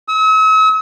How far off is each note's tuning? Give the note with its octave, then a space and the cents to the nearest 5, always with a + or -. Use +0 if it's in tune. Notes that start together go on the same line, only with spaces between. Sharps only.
E6 -45